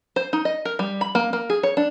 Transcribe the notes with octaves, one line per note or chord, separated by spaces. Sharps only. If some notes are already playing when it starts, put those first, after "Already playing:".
C5
D#4
D#5
A#4
G3
B5
A#3
A#3
G#4
C#5
D4